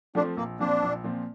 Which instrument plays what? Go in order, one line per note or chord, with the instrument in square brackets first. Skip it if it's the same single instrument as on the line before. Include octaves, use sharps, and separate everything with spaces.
[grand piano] F3 A3 C4 F4 [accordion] D4
[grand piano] A#1 [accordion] A#3
[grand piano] A#2 F3 C4 [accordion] D4
[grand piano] A#1
A#2 F3 C4